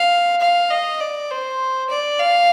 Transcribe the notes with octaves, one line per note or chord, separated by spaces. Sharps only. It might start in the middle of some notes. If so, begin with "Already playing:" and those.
Already playing: F5
F5
D#5
D5
C5
D5
F5